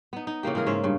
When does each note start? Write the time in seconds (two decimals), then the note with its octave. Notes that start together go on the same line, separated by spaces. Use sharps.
0.13 B3 D#4
0.27 D#4
0.43 C#3 E3 A#3 G4
0.55 E3 G#3 G#4 A#4
0.67 G#2 C#4 E5 F5
0.84 G2 C#3